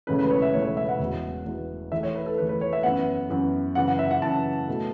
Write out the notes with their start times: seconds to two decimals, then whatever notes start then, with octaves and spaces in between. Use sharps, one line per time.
0.07 E1 E2 C#3 A3 C#4 B4
0.19 B4
0.30 C#5
0.42 E5
0.53 E1 E2 C#3 A3 C#4 C#5
0.65 C#5
0.77 E5
0.89 F#5
0.99 E1 E2 B2
1.45 E1 E2 B2
1.92 E2 E3 A3 E5
2.03 C#5
2.15 B4
2.26 A4
2.38 E2 E3 A3 B4
2.49 B4
2.61 C#5
2.73 E5
2.83 F#2 E3 B3 F#5
3.30 F#2 E3 B3
3.75 F#2 C#3 E3 F#5
3.88 F#5
3.99 E5
4.11 F#5
4.22 F#2 C#3 E3 A5
4.67 B2 A3